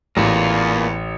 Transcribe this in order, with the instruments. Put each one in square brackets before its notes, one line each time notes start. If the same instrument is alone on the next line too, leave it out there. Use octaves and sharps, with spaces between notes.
[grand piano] A1 [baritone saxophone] E2 [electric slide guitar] A#3 F4